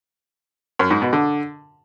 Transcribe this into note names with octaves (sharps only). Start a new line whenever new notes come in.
F#2
G#2
B2
D3